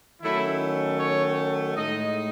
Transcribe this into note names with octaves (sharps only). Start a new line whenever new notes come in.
D#3 F#3 A3 C#4 E4
C#5
A2 G#3 D#4 D#5